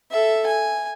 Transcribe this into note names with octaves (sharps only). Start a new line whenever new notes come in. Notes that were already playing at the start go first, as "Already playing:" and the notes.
A4 E5
G#5